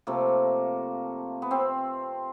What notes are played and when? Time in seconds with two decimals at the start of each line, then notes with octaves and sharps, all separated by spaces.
0.07 C3 F3 A3 A#3
1.42 B3
1.51 C4